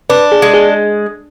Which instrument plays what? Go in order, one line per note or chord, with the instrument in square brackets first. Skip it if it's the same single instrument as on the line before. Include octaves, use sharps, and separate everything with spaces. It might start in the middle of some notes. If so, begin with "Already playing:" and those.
[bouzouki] D4 [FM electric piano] B4
[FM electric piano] G#4
[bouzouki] G#3
[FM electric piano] G#4